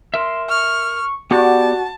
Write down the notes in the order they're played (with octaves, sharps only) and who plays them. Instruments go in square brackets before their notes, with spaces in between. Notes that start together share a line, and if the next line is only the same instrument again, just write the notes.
[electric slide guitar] A#4 E5 [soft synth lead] C6
[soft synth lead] C#6 [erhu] F6
[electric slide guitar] B3 G4 [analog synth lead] F#4 [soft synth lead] D5 [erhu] A5